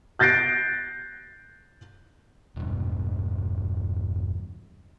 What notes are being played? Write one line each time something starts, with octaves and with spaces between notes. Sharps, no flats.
F#6 G6 A6 A#6 C7 D7
E1 G2